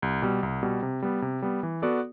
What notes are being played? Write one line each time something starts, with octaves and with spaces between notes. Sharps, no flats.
C2
B2 G3
C2
B2 G3
C3
G3 B3
C3
G3 B3
E3
B3 F#4 A4 D5